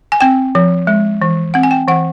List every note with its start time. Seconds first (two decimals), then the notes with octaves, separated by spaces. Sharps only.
0.12 G#5
0.21 C4 G5
0.55 F3
0.87 G#3
1.22 E3
1.54 C4 F#5
1.63 G#5
1.71 G5
1.88 E3 F#5